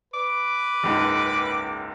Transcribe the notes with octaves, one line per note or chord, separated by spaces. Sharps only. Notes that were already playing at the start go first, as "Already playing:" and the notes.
B4 D6
F#1 C#2 G#2